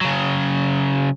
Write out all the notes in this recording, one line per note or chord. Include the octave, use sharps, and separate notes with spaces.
C#3 F#3